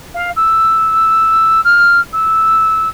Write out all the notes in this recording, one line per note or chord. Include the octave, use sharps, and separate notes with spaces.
F5
E6
F6
E6